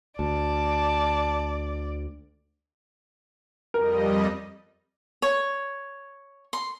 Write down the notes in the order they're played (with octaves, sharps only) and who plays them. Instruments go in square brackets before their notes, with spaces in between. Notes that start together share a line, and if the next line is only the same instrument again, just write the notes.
[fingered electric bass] D2 [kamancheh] D5 [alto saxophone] A5
[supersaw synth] F2 G3 D#5 [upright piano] A#4
[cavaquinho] C#5
C6